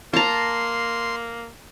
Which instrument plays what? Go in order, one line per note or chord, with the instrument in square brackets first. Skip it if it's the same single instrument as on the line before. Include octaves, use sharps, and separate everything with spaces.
[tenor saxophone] A#3 [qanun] A5 A#5 [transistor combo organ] C6